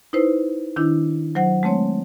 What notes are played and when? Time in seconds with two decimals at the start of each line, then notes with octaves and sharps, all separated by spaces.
0.13 D#4 E4 B4 C5
0.76 D#3 D4 E4
1.35 F#3 C5 F#5
1.63 G#3 A3 C4 C#5